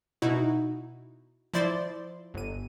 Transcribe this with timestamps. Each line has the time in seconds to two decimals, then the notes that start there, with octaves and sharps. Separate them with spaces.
0.22 B2 D#4 E4 F#4
1.54 F3 E4 C5 D5 C6 A6
2.34 G1 D#7